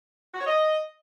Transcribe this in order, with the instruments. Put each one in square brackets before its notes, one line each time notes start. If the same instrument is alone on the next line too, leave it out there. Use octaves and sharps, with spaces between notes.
[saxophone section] F#4
C#5
D#5